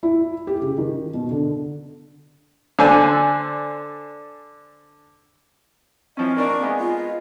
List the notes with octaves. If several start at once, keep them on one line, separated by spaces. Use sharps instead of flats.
E4
G4
C#3
D#3
B2
D3
D3 D4 C5 G#5 E6
E3 F3 C4 C#4 D#5
A#3 D4 A#4 C#6
G#3 B3 D#4 G#5
F4 D#5